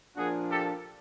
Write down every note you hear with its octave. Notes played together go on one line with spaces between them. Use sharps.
A#2 F3 A#3 D4 F4 F#4 G#4
G4 A4